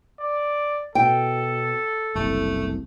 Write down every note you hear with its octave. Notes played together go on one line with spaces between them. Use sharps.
D5
B2 A4 G5
F#1 C2 A3